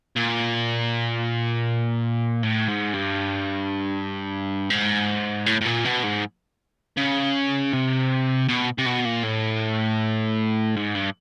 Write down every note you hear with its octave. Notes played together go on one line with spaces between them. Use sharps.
A#2
A2
G#2
G2
G#2
A2
A2
A#2
B2
G#2
C#3
C3
B2
C3
B2
A#2
A2
G#2
G2